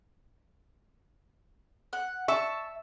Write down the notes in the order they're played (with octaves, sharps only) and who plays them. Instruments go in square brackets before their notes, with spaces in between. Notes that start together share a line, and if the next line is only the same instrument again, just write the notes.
[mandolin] F#5
[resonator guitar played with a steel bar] E5 [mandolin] A5 C#6